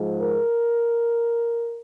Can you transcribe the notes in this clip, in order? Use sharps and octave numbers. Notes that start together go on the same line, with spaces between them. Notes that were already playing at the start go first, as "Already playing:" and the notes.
Already playing: G#2 F3 G#3
A#4